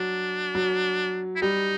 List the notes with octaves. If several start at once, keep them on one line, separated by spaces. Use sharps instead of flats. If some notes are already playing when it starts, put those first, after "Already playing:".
Already playing: F#3 D4
F#3
E4
G3 D#4